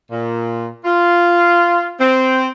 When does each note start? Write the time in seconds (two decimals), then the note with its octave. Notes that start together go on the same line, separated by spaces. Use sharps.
0.11 A#2
0.85 F4
1.99 C4